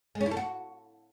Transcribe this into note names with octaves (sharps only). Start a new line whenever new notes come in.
G#3
C#4
E4
A4
F#4